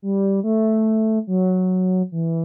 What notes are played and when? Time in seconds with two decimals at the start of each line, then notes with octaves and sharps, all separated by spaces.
0.02 G3
0.44 A3
1.27 F#3
2.12 E3